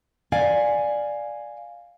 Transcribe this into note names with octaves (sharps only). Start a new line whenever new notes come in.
D5 F5 G#5